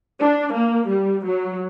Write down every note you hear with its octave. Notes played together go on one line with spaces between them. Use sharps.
D4
A#3
G3
F#3